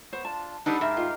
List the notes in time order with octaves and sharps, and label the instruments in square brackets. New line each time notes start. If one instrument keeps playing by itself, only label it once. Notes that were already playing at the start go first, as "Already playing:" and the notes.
[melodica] B3 C#6 [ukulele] C5
[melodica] D4 F4 [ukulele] A5
[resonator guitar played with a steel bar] G3 D4 D#4 [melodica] A4 B4 F#5 [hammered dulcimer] B5
[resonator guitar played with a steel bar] G#2 [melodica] G4 A#4 F5 [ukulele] E5
[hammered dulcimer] D#3 [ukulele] F4